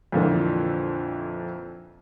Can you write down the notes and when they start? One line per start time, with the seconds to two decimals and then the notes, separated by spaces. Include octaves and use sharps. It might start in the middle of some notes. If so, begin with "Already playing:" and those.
0.12 F2 A#2 D3 E3